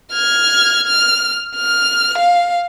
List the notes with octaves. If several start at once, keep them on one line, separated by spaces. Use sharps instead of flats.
F6 G#6
F6
F6
F5